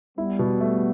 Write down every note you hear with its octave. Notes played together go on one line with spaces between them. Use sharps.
G3 B3 E4
B2
A3